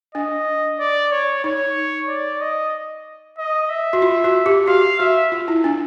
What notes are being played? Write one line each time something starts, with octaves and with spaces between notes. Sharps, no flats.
D4 D#5
D5
C#5
D#4 C#5
D5
D#5
D#5
E5
F#4
F4
F#4
G4
F#4 F5
F#4 E5
F4
E4
D4